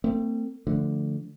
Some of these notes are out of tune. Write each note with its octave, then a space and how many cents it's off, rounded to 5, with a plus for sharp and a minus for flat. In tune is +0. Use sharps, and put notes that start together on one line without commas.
A3 +45 C4 -10
D3 -5 F3 -10 A3 +0